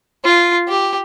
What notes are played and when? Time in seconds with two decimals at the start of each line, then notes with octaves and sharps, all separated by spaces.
0.25 F4
0.69 G4